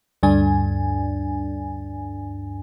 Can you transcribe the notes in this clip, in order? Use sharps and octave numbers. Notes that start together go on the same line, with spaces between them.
D2 G2 D4 G#5